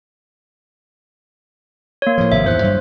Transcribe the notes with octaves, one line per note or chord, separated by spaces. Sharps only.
A#3 C#5
A2 F3
G#1 C3 F3 E5
E2 G#2 C5 F#6
G2 F#3